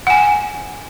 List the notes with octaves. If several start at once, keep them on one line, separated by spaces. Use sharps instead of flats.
F#5 G#5